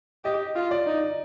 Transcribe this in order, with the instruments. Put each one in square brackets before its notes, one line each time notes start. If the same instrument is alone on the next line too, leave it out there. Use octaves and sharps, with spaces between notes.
[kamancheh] G4 [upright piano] D#5
[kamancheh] F4
[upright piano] D5
[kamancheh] D#4